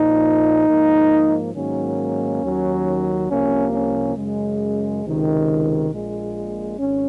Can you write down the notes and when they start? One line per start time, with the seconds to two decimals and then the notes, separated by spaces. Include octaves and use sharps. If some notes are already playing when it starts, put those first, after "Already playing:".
Already playing: A#1 A#2 F3 D#4
0.67 G#2 F3 A#3
1.54 G#2 D#3 F#3 A#3 C#4
2.42 D#2 D#3 F#3
3.28 C2 C3 F3 A#3 C#4
3.73 C#4
4.15 F#2 C#3 G#3
5.03 C#2 C3 D#3
5.89 A#1 A#2 G#3
6.77 G#1 C#4